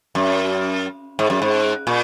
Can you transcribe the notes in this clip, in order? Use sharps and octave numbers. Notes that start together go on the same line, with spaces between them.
F#2
G#2
F#2
G#2
A#2